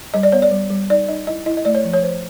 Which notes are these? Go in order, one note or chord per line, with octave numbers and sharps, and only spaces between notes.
G3 D#5
D5
B3 C#5
D5
G3
G3
D#4 D5
D#4 D#5
E4 D#5
E4 D#5
D#5
A3 D5
C#5
F3
C#5
F3 C5